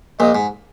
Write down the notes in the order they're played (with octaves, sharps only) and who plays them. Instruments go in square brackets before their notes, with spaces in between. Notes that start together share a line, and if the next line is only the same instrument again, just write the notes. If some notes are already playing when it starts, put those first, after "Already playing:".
[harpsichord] A#1 A#2 [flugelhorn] D#5
[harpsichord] G#2